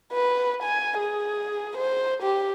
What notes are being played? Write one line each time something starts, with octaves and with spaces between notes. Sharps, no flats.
B4
G#5
G#4
C5
G4